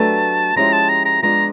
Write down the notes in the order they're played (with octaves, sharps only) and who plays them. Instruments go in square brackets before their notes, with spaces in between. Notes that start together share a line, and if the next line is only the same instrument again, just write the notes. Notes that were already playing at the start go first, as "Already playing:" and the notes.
Already playing: [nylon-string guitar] F#3 A3 D4 G4 B4 [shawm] A5
[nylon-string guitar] F3 G#3 C#4 E4 G4 [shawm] A#5
[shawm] A5
A#5
A#5
[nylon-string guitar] F3 G#3 B3 D4 F4 [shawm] A#5